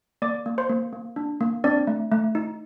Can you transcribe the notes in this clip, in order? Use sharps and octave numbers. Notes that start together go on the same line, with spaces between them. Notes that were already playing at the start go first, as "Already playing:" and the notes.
A#3 D5 D6
A#3
C5 C6
A#3
A#3
D4
A#3
C4 D4 D5
A3
A3
D#4